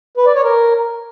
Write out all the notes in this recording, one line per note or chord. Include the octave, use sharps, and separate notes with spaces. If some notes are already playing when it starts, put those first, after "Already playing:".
B4
D5
C#5
A#4